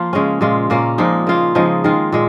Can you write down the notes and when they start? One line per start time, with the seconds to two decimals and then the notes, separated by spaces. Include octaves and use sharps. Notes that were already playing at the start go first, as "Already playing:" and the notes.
Already playing: F3 A#3 F4
0.13 C#3 G#3 C#4
0.41 A#2 G#3 F4
0.70 A#2 A#3 C#4
0.98 A#2 F3 G#3 D#4
1.27 C#3 A#3 F4
1.55 C#3 F3 G#3 D#4
1.84 D#3 G#3 F4
2.12 A#2 G#3